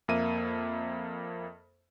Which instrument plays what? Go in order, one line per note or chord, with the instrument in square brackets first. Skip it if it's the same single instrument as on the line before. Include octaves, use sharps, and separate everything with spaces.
[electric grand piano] F2 A#3 E5 D#7